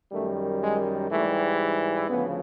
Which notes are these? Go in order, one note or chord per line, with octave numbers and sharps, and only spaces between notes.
F#2 D#3 G3 A3
G#3
G#2 E3 G3 A3
D2 C#3 F3 B3